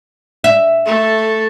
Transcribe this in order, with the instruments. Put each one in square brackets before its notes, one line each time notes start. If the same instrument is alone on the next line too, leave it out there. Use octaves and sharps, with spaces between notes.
[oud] E5
[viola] A3 A4